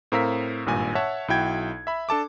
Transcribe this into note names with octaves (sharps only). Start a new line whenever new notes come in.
A2 C4 A#4 F5 E6 B6
G#1 G2 A#2 G#5
C#5 E5 F#5 A5
B1 E4 F#4 G5 G#6
E5 B5
D4 A4 A5 D6